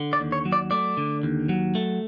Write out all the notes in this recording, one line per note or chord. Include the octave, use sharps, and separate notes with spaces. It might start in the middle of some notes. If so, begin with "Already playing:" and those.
Already playing: D3
D5
D#2
C#5
F#3
D5
A3 D5
D3
D#2
F#3
A3